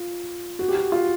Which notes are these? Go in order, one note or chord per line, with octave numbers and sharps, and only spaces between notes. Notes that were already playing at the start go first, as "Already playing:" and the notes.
Already playing: F4
F#4
G4
F#4
F4